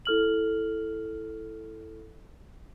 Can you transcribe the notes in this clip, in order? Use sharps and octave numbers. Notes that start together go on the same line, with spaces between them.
E4 A4 F6 F#7